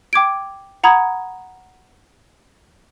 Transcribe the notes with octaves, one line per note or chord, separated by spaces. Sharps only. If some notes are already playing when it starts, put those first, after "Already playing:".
G5 D6 G#6 D7
F#5 A#5 B5 D#6 G#6